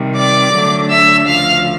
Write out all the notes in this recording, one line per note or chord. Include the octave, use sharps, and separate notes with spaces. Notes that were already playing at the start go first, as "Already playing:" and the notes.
Already playing: C3 D#3 G3
D5 D6
D3 F#3 A3 D4
E5 E6
D2 C#3 F3 F5 F6